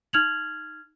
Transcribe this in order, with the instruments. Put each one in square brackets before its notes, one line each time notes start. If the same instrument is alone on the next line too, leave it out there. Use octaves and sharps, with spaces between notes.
[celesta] D#4 F6 G#6 F7 F#7